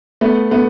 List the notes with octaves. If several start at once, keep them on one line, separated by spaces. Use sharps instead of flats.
A3 B3
A3 B3